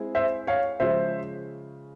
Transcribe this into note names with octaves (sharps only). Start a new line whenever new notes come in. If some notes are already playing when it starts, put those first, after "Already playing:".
Already playing: G#3 C4 E4 G#4
C5 E5
C#5 F5
C#3 F3 G#3 C5 E5